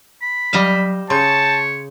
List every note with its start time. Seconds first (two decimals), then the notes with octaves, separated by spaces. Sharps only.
0.22 B5
0.53 F#3 G3 D#5 F5 E7
1.10 C#3 C#5 A5 C6 G6